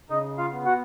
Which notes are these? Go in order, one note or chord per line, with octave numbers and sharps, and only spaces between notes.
C#3 D#4 D#5
F4 F5
B3
F#4 F#5